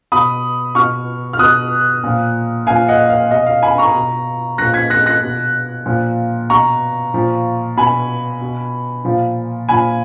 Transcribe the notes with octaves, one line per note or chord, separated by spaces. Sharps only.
B2 B5 D#6
B2 C#6 F6
F6
B2 D#6 F#6
A#2 F3
A#2 F3 F5 G#5
D#5 F#5
F5
B2 D#5
F5
G#5 B5
A#5 C#6
B2
A#2 F3 F#6 A#6
G#6 B6
F#6 A#6
F#6 A#6
B2
A#2 F3
B2 A#5 C#6
A#2 F3
B2 G#5 B5
B2
A#2 F3
A#2 F3 G#5 B5